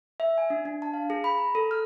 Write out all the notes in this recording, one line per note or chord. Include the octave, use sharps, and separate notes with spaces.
E5
G#5
D4
D4
A5
F5
G#4
B5
A#5
A4
F6